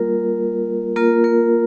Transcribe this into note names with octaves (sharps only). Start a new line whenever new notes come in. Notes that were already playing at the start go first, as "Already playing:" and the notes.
Already playing: G3 A#3 F4 A#4
A#3 F4 A#4
A#4